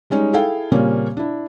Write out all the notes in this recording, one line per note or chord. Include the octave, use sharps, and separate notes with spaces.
G3 G#3 C#4 D#4
E4 G#4 A4 F5 G5
A#2 C#3 G3 A#3 C4 C#4
D4 E4